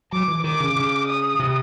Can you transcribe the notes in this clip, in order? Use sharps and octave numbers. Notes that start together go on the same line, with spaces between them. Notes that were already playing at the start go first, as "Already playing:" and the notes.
F#3 D6
E3
D#3 D6
C#3
C#3
D#6
C3